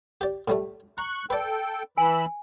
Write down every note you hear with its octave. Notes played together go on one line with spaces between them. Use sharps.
G4 D5
A2 G3 A3
A#5 C#6 F#6
A4 B4 D5 G5
E3 G#5 B5 E6